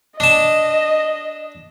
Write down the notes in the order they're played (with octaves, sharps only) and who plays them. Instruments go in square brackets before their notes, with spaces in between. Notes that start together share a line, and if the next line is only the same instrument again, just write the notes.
[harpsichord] D4 A5 [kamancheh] D#5